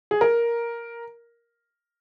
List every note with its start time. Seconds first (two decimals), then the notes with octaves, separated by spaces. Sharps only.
0.11 G#4
0.21 A#4